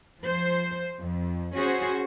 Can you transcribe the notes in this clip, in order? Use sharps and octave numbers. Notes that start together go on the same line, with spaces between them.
F3 C5
F2
C#4 F#4 G#4 C5